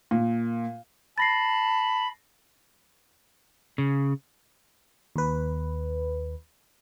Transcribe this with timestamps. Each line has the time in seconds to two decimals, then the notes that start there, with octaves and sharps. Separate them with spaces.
0.11 A#2
1.18 A5 B5 A6 A#6 C7
3.78 C#3
5.16 D#2 B4